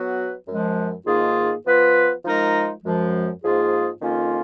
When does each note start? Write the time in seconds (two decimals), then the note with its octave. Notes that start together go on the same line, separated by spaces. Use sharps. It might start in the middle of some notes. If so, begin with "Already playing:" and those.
Already playing: F#3 B3 F#4 B4
0.47 F#2 F3 G#3
1.06 G#2 D#3 A#3 F4 G#4
1.65 F3 B3 F4 B4
2.23 F3 G#3 D#4 A#4
2.83 F#2 F3 G#3
3.42 G#2 F3 A#3 F4 G#4
4.01 F2 D#3 A#3 C#4 F4